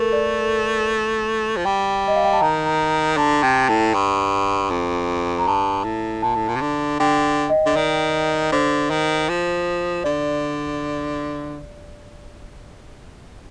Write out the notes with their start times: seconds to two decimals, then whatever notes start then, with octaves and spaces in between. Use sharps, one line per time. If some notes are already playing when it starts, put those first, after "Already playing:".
Already playing: A3 A4 A#4
0.13 D5
1.57 F3
1.65 G3 G5
2.08 D#5
2.16 F5
2.24 G5
2.33 A5
2.41 D#3 A#5
2.66 A#5
3.17 D3 A5
3.43 C3 G5
3.69 A2 A5
3.94 G2
4.70 F2
5.39 A#5
5.47 G2 A5
5.84 A2
6.23 A#2 A5
6.35 A2
6.48 A#2
6.56 C3
6.61 D3
7.00 D3 G5
7.50 D#5
7.66 D3
7.76 D#3 D5
8.52 D3 C5
8.90 D#3
9.29 F3
10.04 D3 D5